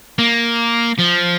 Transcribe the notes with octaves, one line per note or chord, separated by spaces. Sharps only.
A#3
F3